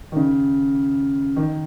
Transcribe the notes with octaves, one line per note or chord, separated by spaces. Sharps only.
D#3
C#3
D#3